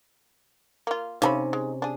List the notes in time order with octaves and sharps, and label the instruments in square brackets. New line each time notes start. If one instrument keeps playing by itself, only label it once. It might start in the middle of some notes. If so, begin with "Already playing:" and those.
[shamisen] A#3 F4
[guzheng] C3 C#4 [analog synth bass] D#4 [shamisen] F5 A5 B5
[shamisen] G#3
D4 G#4